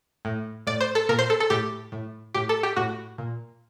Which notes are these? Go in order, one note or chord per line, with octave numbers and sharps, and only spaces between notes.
A2
A2 D5
C5
A4
A#2 A#4
C5
A4
A4
A2 G4
A2
A2 G4
A4
G4
A2 F#4
A#2